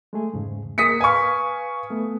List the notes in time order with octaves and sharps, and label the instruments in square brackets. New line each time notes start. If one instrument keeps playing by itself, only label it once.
[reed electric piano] G#3 A3 G#4
E2 G#2 C#3
[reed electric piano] A#3 G#4 A#4 [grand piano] D#6 B6 C#7
[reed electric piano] B4 F5 F6 [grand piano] G#5 C#6
[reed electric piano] A3 B3